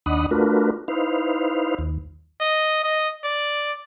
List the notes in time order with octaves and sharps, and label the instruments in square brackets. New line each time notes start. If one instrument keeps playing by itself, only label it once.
[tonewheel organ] D#2 D4 D#5 F#5 B5 D#6
A3 D4 F4 F#4 A#4 B4
D#4 E4 B4 C5 F5
D#2
[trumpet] D#5
D#5
D5